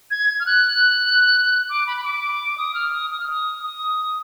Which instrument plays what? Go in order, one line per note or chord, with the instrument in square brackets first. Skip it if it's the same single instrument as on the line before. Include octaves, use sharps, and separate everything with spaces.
[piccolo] G#6
F6
F#6
D6
B5
B5
D6
D#6
F6
D#6
D#6
F6
D#6
D#6